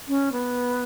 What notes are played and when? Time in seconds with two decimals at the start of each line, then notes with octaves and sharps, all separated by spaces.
0.08 C#4
0.32 B3